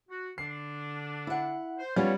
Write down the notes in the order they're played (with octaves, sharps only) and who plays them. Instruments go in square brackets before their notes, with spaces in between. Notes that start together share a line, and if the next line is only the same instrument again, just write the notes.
[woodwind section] F#4
[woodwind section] D3 D4 [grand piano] C7
[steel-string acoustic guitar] E4 F#5
[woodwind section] C5
[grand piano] G3 [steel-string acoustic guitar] B3 C#4 F4 [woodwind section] C#5